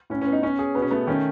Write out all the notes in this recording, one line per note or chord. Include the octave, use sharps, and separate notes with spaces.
A2 C#4
B3 C#4
D#4
C#4 C#5
G#4
B2 B3
C#4
A3 B3
D#3 C#4